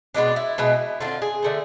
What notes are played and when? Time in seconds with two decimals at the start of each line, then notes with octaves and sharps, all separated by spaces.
0.14 B2 G#3 B3 D4
0.36 E4
0.58 B2 G#3 B3
1.00 D3 A3 C4 F4
1.22 G#4
1.42 D3 A3 C4